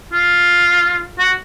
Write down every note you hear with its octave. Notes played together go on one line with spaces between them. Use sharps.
F4
F#4